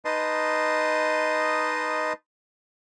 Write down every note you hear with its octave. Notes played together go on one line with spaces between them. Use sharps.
D#4 B4 D#5 A5 C6